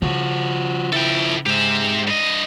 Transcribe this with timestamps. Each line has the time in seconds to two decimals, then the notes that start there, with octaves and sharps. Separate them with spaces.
0.02 C#3 F3 F#4
0.92 F3 E4 A4 G5
1.46 G#2 G4 E5
2.07 G2 D#5